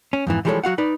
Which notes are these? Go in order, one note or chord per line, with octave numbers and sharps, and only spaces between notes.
C#4
F2 G#2 E3
E3 F3 G3 G#3 A4 C#5
F#3 F#4 F5 F#5
D#4 B4 D5